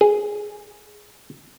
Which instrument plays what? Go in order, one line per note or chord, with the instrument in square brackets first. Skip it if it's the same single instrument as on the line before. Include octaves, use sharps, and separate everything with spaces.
[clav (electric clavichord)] G#4